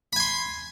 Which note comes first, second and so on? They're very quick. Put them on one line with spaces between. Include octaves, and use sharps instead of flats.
B5 G#5 C6